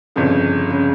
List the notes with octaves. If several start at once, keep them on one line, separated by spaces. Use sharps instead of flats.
G1 F2 C#3
C#3